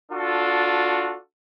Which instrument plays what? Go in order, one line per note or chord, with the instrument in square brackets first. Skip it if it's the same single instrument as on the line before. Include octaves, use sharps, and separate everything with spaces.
[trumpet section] D4 F4 F#4 A4